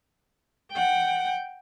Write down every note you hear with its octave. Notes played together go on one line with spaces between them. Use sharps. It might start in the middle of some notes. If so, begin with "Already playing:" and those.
F#5 G5